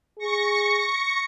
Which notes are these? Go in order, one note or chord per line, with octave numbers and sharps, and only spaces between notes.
G#4 C#6 A#6 C#7